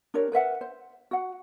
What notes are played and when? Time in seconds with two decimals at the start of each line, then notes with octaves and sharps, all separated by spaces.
0.14 D4 G4 A#4 C#5
0.32 A#4 B4 E5 F#5
0.61 C5
1.11 F#4 F#5